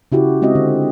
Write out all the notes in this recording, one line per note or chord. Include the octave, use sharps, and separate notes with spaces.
C#3 E4 F#4 G4
G#3 C4 F#4 D#5 E5
D3